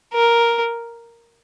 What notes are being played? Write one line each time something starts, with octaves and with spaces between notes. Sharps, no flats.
A#4